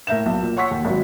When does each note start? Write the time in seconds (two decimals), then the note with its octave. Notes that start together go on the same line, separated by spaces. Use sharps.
0.07 A2 A#4 E5 G6 E7
0.26 B1
0.42 A#2
0.57 C#5 F#5 C6 C#6 E6 B6
0.71 D#2
0.85 G#1 F#3